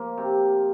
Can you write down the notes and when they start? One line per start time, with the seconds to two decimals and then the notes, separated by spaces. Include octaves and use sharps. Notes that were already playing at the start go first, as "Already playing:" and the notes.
Already playing: F3 A#3
0.18 C3